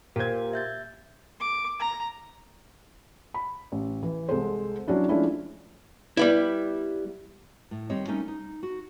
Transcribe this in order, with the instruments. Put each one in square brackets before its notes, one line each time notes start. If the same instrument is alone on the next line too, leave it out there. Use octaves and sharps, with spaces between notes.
[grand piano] A#2 G#6 [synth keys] G4 C5 [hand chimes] A#4
[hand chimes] E5 G6 A6
[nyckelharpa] D6
A#5
[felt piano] B5
A1
E3
C2 G#3 A4 C5
F#3 C#4 D4 E4
F3 G#3 A3 C#4 D4 E4
[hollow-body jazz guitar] G3 B3 E4
[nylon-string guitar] A2
D#2 G3 C4 C#5 D#5
G3 A3 A#3 C#4 D#4
D#4
F#4